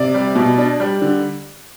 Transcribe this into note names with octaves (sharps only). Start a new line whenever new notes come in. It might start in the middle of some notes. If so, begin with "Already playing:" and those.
Already playing: C3 D5
G3
B2
D4
G3
D3